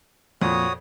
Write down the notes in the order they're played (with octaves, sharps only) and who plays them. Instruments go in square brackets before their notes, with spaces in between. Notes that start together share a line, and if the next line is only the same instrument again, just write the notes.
[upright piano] F2 A#2 [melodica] F#4 C#5 D#6